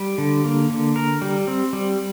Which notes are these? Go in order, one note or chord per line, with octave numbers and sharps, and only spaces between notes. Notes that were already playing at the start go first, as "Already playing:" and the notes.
Already playing: G3
D3
A#3
D3
A#4
G3
C4
G3